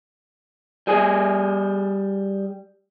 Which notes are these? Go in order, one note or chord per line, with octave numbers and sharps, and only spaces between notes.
G3 G#4 G#5